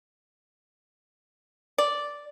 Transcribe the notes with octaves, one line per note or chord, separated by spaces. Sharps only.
D5